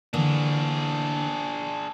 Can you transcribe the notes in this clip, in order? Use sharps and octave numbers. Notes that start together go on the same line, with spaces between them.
D3 E3 A#3 D4 G#4